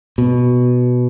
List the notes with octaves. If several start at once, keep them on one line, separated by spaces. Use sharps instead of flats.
B2